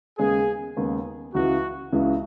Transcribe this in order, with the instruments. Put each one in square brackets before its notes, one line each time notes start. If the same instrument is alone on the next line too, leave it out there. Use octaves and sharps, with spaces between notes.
[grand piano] D#2 C#3 G#3 B3 [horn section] G#4
[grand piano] D#2 C#3 G#3 B3
[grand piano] C#2 C#3 E3 G#3 [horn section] F#4
[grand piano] C#2 C#3 E3 G#3